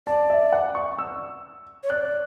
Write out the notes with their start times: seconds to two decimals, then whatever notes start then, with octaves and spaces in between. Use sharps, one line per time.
0.07 D5 A5
0.30 E5
0.52 F#5
0.75 C#6
0.99 E6
1.83 C#5
1.89 D5 F#6